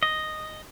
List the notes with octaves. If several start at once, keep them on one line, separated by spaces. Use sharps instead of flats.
D#5